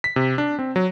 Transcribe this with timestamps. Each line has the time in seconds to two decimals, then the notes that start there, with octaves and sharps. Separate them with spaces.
0.04 B6
0.16 C3
0.38 D4
0.59 C4
0.76 F#3